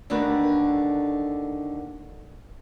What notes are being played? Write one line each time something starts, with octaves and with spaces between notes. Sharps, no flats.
D#2 D3 A3 D4 A#4 B4